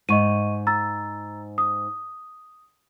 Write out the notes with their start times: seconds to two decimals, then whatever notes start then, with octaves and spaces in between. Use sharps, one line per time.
0.09 G#2 D#5 C#6 D#7
0.67 A#5 E6 A6
1.58 D#6